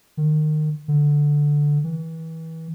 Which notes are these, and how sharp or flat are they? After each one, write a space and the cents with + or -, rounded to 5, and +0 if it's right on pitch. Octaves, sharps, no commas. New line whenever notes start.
D#3 -25
D3 +0
E3 -30